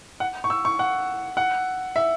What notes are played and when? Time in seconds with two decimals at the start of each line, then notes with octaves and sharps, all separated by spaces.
0.20 F#5
0.44 C#6
0.50 E6
0.65 C#6
0.79 F#5
1.37 F#5
1.96 E5